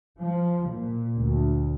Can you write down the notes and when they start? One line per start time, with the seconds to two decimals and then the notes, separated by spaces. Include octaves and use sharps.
0.18 F3
0.71 A#2
1.19 D2